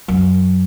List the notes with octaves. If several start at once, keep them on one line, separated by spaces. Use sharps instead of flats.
F#2